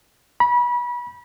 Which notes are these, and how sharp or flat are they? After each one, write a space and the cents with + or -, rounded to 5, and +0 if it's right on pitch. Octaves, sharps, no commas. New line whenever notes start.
B5 -30